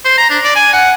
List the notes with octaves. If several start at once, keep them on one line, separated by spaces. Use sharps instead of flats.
C5
A#5
D4
D5
G#5
F#5